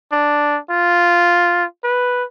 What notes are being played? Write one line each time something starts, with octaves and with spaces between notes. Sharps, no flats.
D4
F4
B4